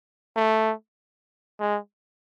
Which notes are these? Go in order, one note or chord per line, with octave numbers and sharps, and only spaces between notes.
A3
G#3